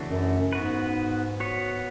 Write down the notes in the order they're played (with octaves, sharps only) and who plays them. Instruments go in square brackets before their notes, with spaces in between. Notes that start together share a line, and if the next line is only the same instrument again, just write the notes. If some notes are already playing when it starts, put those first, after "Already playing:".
Already playing: [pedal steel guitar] C#3 E3 A3 D4 F#4
[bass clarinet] F#2
[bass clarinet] G#2 [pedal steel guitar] B3 F#4 B4
[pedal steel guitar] B3 F#4 C#5